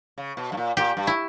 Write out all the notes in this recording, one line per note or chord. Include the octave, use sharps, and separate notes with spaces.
C#3
B2
G2
A#2
A#2 G4
G2
E4